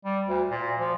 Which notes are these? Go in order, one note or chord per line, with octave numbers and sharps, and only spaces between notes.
G3
D2
A#2
F3